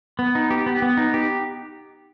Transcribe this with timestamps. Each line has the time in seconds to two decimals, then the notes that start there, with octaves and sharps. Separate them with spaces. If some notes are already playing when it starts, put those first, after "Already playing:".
0.19 B3
0.35 D#4
0.51 G4
0.66 B3
0.82 B3
0.97 D#4
1.14 G4